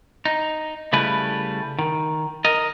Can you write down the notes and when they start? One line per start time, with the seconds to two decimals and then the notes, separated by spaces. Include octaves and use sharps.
0.25 D#4
0.93 C#3 G3 A3 E4 B4
1.79 D#3
2.45 A#4 D#5